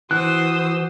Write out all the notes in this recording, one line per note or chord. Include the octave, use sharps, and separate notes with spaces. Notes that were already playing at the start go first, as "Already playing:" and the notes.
E3 F#4 C5 D#6 E6 F#6